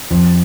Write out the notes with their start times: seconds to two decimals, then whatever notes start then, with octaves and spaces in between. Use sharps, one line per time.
0.11 F2